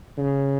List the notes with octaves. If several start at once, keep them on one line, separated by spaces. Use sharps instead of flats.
C#3